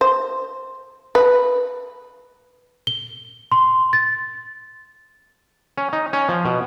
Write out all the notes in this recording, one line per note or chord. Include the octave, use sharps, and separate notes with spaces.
C5
B4
G7
C6
A6
C#4
D#4
C#4
F3
B2